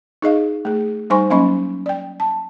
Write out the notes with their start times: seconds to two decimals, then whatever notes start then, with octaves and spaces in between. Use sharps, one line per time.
0.22 D#4 G#4 D#5 F5
0.65 A3 G#4
1.10 G3 D#4 C5 G#5 C6 C#6
1.30 F#3 A#3 C#4 D#5 B5 C#6
1.86 D5 G5
2.20 A5